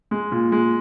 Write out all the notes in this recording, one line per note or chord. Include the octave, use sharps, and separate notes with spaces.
G#3
A#2
G#3